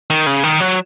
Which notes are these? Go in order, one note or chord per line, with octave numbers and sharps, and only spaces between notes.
D#3
C#3
D#3
F#3